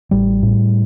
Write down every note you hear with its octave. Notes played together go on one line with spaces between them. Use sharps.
A1 G3
A2